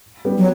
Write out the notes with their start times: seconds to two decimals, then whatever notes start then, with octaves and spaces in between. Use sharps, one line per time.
0.25 G3 B3
0.38 F#3